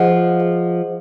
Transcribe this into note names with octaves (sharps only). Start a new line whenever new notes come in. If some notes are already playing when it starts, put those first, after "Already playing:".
Already playing: F3 G#4 D#5 F#5
G#4 D#5 F#5